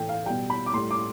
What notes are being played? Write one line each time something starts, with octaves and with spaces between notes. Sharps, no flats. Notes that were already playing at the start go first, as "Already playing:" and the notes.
Already playing: A2 E3 A3 G5
F5
B2 G3 G5
B5
D6
A2 G3 C6
D6